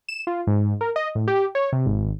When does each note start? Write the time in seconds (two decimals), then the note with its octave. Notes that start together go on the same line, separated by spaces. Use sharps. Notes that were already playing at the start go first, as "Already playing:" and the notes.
0.09 E7
0.27 F4
0.47 G#2
0.81 A#4
0.96 D#5
1.15 A2
1.28 G4
1.55 C#5
1.73 C3
1.86 G#1